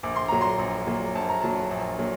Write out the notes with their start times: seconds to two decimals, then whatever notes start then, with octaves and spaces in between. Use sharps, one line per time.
0.03 A#1 D6
0.16 C6
0.28 A#2 F#3 A#5
0.41 C6
0.59 A#1
0.87 A#2 F#3
1.15 A#1 A5
1.29 A#5
1.42 A#2 F#3 A5
1.71 A#1
1.99 A#2 F#3